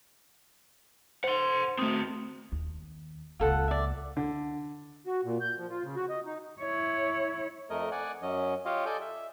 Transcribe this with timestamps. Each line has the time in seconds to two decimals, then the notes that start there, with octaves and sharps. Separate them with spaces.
1.24 C5 F#5 C6
1.79 A3 C4 F#4 D#6
2.52 D#2
3.40 C#2 A#3 F4 A4 F#5
3.68 D5 E5
4.17 D3
5.06 F#4
5.25 A#2
5.41 G6
5.58 F3
5.70 F4
5.84 C#3
5.96 F#4
6.09 D#5
6.26 D#4
6.60 E4 C#5
7.70 F2 A3 A#4 D#5
7.92 D5 F#5 G#5
8.22 F#2 F#3 C#4 D#5
8.65 F4 G4 C#5 D#5 F5
8.86 A4 D5 D#5 G#5 G6
9.01 E5